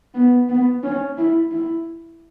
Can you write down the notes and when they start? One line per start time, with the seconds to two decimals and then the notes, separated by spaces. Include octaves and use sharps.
0.14 B3
0.49 B3
0.83 C#4
1.18 E4
1.51 E4